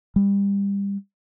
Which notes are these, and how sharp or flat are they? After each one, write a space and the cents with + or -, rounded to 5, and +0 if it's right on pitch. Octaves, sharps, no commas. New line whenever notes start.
G3 +25